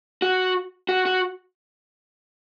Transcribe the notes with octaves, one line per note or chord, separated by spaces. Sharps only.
F#4
F#4
F#4